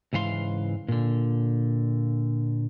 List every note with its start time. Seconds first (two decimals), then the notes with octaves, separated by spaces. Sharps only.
0.13 C#2 G#2 E3 F5 C6
0.88 A#2 D3